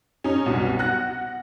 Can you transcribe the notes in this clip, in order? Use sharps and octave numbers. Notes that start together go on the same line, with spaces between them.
C#4 D#4
C2 F#2 B2
F#5 F#6 A#6